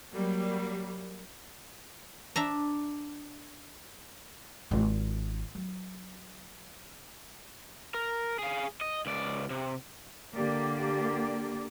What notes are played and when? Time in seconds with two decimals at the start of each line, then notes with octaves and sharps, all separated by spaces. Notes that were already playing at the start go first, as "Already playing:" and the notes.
0.13 F#3 G3 A#3
2.36 D4 E5 A#5
4.71 G#1 F4
5.55 F#3
7.94 A#4
8.39 G#4 F5
8.81 D#5
9.06 C#2 D5
9.50 C3
10.34 D3 A#3 G4 D5